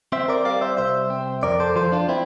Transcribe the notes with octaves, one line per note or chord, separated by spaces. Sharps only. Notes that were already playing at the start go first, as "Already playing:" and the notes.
C4 C5 E5
A#4 D5
G3 D5 F5
C5 E5
C2 C5 E5
C4
F2 A#4 D5
A4 C5
F3 A4 C5
D4 F4
C4 E4